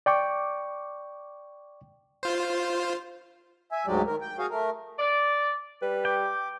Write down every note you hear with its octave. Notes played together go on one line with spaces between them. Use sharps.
D5 G5 C#6 D6
F4 C5
E5 G#5
D2 G#2 F#3 G#3 G4 D5
D#3 A#4
G5
F#4 G#4 C#5 F5
A3 A#4
D5
G3 B4
G4 G5 D6